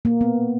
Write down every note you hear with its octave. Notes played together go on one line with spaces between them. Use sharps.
A#3
B3